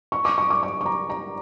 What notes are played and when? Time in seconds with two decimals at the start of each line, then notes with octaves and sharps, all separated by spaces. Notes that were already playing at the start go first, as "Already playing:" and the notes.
0.12 C#6
0.25 D6
0.38 C#6
0.50 D6
0.63 C#6
0.81 C#6
0.86 A#5
1.10 A#5